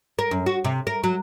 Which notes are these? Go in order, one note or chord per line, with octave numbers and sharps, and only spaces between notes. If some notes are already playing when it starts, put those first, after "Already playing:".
A#4
F#2
F#4
C3
A#4
F#3